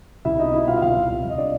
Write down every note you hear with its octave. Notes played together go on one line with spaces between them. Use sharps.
C2 E4 E5
B2 D#4 D#5
B2 E4 E5
B2 F4 F5
E5
C2 F4 F5
C2
C2
C2 D#5
D4 D5